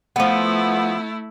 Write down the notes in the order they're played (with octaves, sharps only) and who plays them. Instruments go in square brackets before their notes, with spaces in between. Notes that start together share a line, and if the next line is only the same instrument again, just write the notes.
[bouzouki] F3 B3 [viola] A3 E4